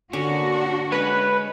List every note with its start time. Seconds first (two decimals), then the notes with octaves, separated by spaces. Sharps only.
0.13 D3 A#3 C#4 D4 F#4
0.92 G#3 C#4 B4